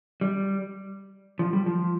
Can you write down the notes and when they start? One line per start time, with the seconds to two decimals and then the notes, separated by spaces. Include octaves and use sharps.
0.21 G3
1.39 F3
1.53 G3
1.66 F3